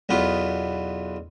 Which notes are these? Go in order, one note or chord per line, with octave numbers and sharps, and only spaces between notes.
B1 E2 B3 F4